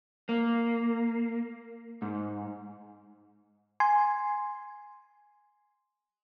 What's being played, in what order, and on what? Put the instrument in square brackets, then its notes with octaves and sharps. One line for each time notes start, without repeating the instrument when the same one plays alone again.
[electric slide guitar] A#3
G#2
[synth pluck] G#5 C6